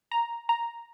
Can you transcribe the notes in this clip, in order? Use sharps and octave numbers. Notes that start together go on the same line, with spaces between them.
A#5
A#5